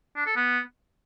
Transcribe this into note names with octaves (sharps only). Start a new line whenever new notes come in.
D4
A4
B3